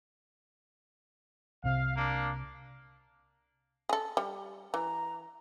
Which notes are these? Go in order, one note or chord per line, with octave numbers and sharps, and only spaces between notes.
C2 C3 F5
A#3 D4
G#4 A4
G3
E3 A#5